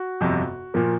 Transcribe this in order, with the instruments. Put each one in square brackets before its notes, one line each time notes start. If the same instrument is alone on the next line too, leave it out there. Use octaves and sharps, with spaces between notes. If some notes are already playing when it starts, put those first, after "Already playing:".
Already playing: [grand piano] F#4
G1 F2 C3
A#2 F3 A#3